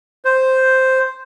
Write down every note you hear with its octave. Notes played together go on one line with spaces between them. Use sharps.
C5